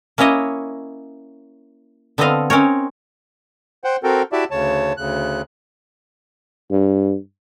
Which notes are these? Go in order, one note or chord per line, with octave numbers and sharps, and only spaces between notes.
A#3 C#4 E4 C#5 D#5
D3 B3 C4 A4 D#5 F5
C4 C#4 D#4 A#4 C#5
C5 F#5 G5
C4 F#4 A4 A#4 G5
E4 F#4 G4 D5 E5 A5
D2 C#3 C#5 A5
D2 C#3 F#6
G2